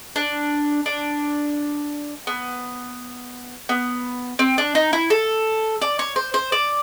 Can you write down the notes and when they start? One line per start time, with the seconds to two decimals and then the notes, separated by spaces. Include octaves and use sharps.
0.16 D4
0.86 D4
2.27 B3
3.69 B3
4.39 C4
4.58 D4
4.75 D#4
4.93 E4
5.10 A4
5.82 D5
5.99 C#5
6.16 C5
6.34 C5
6.52 D5